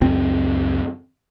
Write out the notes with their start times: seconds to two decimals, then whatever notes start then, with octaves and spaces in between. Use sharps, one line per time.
0.01 C#2 F#2 C4